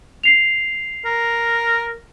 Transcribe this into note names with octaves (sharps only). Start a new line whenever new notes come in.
C7 F7
A#4